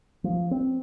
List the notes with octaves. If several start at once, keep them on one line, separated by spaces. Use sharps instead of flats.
F3
C4